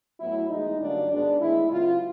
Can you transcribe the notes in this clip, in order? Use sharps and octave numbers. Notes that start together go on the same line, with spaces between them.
A2 F#3 B3 E4
A2 E3 G#3 B3 D#4
G2 D3 F#3 A#3 C#4 D4
G#2 D#3 G#3 B3 D4
A2 E3 G#3 B3 E4
C#3 F#3 B3 F4